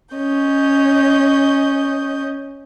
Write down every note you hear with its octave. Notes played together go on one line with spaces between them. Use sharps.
C#4 D#5 G6